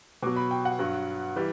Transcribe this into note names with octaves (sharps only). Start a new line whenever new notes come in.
B2 F#3 D6
B5
G5
F#5
G2 F#3
E3 G3